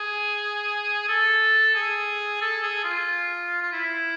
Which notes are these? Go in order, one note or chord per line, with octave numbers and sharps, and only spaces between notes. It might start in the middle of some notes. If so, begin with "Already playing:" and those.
Already playing: G#4
A4
G#4
A4
G#4
F4
F4
E4